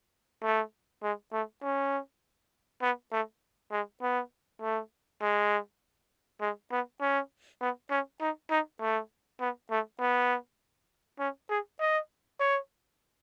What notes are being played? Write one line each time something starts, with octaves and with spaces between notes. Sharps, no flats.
A3
G#3
A3
C#4
B3
A3
G#3
B3
A3
G#3
G#3
B3
C#4
B3
C#4
D#4
D#4
A3
B3
A3
B3
C#4
G#4
D#5
C#5